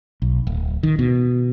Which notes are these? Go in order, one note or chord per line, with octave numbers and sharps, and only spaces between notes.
B1
D1
D#3
B2